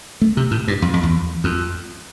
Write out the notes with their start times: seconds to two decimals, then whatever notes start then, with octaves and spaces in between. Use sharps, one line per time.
0.21 A3
0.37 C3
0.51 A2
0.68 G2
0.82 F2
0.94 F2
1.03 E2
1.44 F2